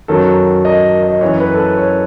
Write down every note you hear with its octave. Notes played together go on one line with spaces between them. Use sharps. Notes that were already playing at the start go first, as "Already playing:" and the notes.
F#2 D#3 F#3 A4
D#5
D#5
F#2 E3 C#5
B4
A4
B4
C#5